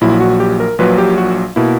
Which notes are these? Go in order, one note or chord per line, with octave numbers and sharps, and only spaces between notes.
A#1 A#2 F#3 E4
F#4
G4
A#4
A#1 A#2 F#3 B4
G4
F#4
B2 A#3 E4